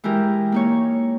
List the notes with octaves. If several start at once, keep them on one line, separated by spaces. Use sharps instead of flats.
E3 G#3 E4 G4 A#4
A#3 D#4 C#5